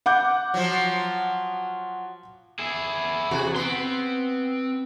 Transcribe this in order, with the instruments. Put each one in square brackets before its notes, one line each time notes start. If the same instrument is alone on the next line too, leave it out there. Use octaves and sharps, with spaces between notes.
[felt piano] F#5 D6 G6
[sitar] F3 F#3
[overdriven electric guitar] E4 G#4
[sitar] E2 C3 F#4
[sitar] B3 [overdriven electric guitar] C4 C6